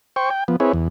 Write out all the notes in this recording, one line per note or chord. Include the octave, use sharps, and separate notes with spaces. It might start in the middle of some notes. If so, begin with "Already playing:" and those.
C5 G5 C#6
G5
F3 B3
C4 E4 G#4 B4 C#5
E2